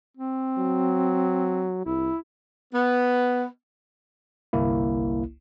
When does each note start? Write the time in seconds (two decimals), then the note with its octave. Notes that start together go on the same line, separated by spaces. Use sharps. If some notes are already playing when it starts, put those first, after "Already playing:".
0.17 C4
0.58 F#3
1.86 C2 E4
2.73 B3
4.53 G1 C2 A#3 E4